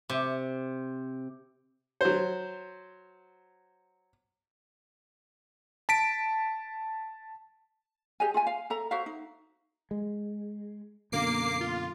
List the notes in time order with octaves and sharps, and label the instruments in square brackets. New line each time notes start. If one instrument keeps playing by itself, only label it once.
[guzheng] C3
[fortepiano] F#3 C5
[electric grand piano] A5 B6 D7
[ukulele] G4 G#4 D#5 G#5
F4 E5 G#5
F5
A4 E5 A#5
F#4 C5 E5 F5
D#4
[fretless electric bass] G#3
[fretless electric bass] F#2 B2 D3 [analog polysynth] A#3 D6 C7
[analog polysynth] F4